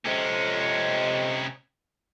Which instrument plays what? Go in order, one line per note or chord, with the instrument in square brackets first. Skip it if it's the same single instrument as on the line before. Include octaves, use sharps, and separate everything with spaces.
[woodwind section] F2 G#3 [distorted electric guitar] C3 C#4